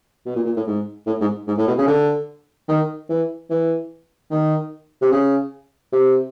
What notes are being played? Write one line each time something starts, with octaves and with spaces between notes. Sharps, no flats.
B2
A#2
A#2
A2
G#2
A2
G#2
G#2
A2
B2
C#3
D3
D#3
E3
E3
D#3
C3
C#3
C3